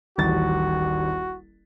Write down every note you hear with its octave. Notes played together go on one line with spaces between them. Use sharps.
D#1 A1 F#4 A6